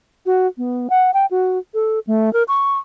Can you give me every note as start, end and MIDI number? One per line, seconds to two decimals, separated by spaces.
0.26 0.47 66
0.58 0.88 59
0.90 1.11 78
1.14 1.26 79
1.31 1.59 66
1.74 1.99 69
2.07 2.32 57
2.33 2.43 70
2.48 2.78 85